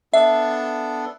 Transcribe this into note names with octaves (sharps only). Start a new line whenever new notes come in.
B3 D4 A4 E5